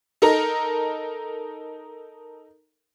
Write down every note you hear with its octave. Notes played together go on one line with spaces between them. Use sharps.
D#4 A4 A#4 A#5